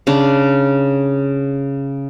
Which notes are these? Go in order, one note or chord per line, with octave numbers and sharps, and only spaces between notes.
C#3 D4